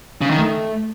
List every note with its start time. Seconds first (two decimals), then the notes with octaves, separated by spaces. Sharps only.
0.21 C#3
0.30 D#3
0.39 A3